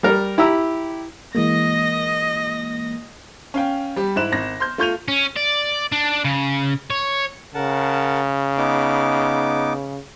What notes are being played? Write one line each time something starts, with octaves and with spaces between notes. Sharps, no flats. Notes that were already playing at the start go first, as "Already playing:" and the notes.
G3 A#4
E4 G4 A#5 E6
E3 G#3 A#3 D#5 A#6
C#4 F5 G5
G3 G4
G#2 E4 F#6 E7
G#1 A#6
C6 F6 G6
A3 F4 C#6 G6 D#7 F7
C#4
D5
D4
C#3
C#5
C#3 A#4 F#5 A5
B3 D#4 D6